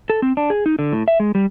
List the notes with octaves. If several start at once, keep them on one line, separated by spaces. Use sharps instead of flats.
A4
C4
D4
G#4
D#4
D3
A2
E5
G#3
G3